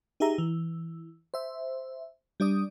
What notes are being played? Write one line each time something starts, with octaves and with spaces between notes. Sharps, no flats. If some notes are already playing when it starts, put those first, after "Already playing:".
D#4 G4 G#4 E5 A#5
E3
C5 E5
G3 D4 D5 D#6